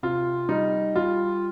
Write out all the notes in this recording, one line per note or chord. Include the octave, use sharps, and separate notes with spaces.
C3 F4
G3 D#4
G3 F4